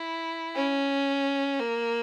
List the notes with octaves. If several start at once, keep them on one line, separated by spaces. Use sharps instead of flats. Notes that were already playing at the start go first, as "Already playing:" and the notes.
Already playing: E4
C#4
A#3